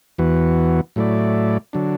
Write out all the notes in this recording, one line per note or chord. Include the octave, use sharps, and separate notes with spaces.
E2 E3 B3 F#4
A2 F#3 A3 E4 D5
D3 F#3 D4